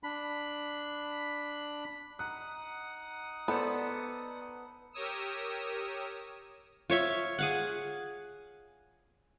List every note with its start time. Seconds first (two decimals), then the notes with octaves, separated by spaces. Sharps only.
0.03 D4 B5
2.19 D#4 F#5 D#6 F#6
3.48 B3 A4 C5 D5
4.93 G4 A#4 C#5 D#6 E6
6.90 F4 C#5 E5 C6
7.39 G#4 F5 F#5